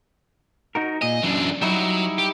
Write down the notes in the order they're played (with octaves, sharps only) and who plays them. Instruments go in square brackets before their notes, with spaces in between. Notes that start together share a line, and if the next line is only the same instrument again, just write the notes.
[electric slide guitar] D#4 F#4 A#4
[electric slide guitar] A#2 G#4 [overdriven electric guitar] D#5
[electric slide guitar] F#2 [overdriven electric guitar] E3 D4
[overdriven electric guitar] F#3 [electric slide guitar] G3 D#4 E4
[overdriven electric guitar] G4